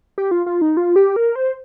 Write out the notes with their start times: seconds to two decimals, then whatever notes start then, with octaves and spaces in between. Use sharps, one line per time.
0.18 G4
0.31 F4
0.46 F4
0.62 D#4
0.77 F4
0.96 G4
1.16 A#4
1.36 C5